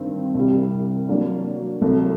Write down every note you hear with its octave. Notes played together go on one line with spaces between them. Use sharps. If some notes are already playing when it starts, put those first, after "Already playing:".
Already playing: G2 D#3 G3 C4
C2 C3 G3
F#3 A#3 D4
C2 C3 F#3 A3